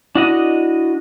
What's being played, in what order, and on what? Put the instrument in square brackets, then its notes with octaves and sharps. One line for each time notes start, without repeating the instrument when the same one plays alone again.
[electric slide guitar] D4 F#4 D#5 [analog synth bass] E4